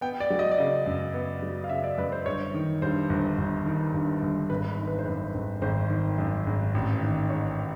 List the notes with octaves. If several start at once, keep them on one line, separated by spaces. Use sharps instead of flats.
B3 G5
D5
F#3
D#5
D5
C#3 D#5
F#2
B3
F#3
F5
C#3 E5
D5
F#2 B4
C5
G1 C#5
D#3
G2 C5
G1
G1
D#3
G2
G1
G#1 B4
B4
D#3
B4
C5
F#2 B4
G#1
G#1 C5
D#3
F#2
G#1
A1
D#3
G#2 C#5